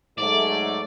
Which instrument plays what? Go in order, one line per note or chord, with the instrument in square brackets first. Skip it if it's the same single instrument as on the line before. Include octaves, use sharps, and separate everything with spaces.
[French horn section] G#2 F#3 A3 [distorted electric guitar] D5